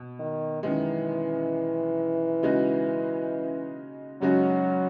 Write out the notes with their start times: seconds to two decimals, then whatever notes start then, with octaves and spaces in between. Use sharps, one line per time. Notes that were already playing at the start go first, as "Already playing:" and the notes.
Already playing: B2
0.19 D#3
0.63 F#2 D#3 E3 G#3
2.43 C#3 G#3 D#4 F#4
4.21 F#2 C#3 F#3 G#3 D#4 F#4